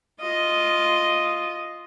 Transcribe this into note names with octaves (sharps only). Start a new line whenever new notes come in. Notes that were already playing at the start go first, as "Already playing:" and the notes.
F4 D#5